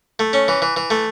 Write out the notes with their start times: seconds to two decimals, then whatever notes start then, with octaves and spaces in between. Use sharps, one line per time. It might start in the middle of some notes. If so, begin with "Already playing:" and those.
0.19 A3
0.33 C#4
0.48 E3
0.62 E3
0.77 E3
0.90 A3